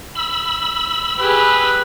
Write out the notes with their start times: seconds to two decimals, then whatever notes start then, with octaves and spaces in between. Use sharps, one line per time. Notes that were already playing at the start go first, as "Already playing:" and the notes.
0.15 B5 E6
1.19 G4 G#4 B4